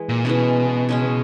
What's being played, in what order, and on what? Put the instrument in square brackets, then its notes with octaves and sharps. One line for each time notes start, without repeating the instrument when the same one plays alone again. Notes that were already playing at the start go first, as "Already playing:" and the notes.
Already playing: [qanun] E3 G#3
[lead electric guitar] A#2
[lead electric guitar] B2 [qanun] E3 G#3 C#4
[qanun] C#3 G#3 C#4